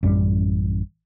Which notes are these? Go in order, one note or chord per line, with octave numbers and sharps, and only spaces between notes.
A1 F#2 G3